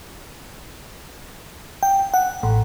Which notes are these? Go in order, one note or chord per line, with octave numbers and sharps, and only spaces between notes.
G5
F#5
A1